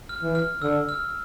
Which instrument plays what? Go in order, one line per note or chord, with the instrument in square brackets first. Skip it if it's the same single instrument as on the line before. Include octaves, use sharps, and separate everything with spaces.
[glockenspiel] F6
[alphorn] E3
[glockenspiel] F6
[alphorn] D3 [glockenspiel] E6
[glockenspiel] F6